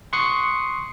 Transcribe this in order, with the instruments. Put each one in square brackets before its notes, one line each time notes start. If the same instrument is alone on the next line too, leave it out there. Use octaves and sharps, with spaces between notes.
[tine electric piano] C6 C#6 D#6 F#6 C7 C#7